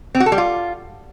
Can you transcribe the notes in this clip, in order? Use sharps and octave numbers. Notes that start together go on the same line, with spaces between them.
C4
F#4
A4
G3
F4